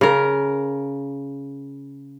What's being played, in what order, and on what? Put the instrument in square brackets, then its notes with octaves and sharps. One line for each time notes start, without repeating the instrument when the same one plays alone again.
[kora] C#3 A#4